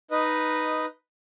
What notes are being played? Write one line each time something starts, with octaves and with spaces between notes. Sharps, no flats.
D#4 B4 D#5